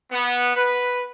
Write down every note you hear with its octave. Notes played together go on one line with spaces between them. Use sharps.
B3
B4